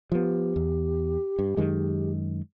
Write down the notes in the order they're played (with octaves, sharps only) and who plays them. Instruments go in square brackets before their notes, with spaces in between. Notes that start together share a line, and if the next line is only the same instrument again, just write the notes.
[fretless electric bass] F3 B3 [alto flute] G4
[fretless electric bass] E2
G2
F#2 D#3 G#3